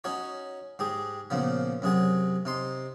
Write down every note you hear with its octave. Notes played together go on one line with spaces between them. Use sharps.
C#4 D#4 F#4 C#5
G#2 G4 G#4
A#2 C#3 F3 B3
F#2 C3 G#4 F#5
C3 D#4 C6